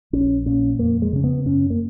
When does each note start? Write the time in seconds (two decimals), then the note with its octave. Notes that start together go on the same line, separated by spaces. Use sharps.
0.13 A#1 C#4
0.46 A#2 C#4
0.79 F2 A#3
1.02 G#3
1.13 C#3 C#4
1.24 B3
1.45 F#2 C#4
1.70 A#3